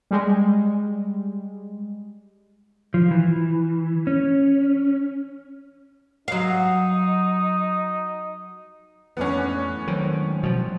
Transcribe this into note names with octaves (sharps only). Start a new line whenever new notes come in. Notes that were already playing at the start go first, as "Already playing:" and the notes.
G3 G#3
F3
E3
C#4
F#3 D#4 F5
F2 A2 E3 B3 C#4 D4 F#5
D#3 F#3 G#3 C4
B2 F3